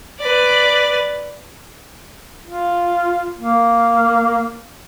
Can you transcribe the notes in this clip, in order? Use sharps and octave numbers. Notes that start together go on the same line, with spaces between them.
B4 D5
F4
A#3